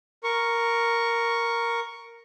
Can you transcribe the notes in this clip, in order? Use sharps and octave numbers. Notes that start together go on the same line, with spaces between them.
A#4 C#6